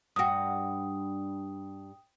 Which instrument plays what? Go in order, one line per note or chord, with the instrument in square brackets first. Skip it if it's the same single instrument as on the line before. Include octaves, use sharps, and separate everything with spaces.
[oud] G2 F#4 [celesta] G5 D#6